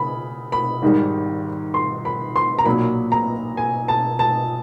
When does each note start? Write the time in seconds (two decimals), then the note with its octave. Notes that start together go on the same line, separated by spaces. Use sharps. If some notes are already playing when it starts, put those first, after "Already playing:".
Already playing: C#3 B5
0.52 B5
0.82 G#1 G#2 D#3 G3
1.74 C6
2.05 B5
2.36 C6
2.59 A#5
2.65 B1 A#2 F#3 A#3 B5
3.12 A#5
3.57 G#5
3.88 A5
4.19 A5